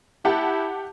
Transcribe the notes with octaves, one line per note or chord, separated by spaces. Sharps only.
E4 G4 F#5 A5